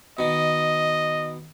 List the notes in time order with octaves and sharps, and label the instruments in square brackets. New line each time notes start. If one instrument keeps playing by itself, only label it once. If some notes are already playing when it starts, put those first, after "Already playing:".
[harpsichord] B2 D#3 [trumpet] D#5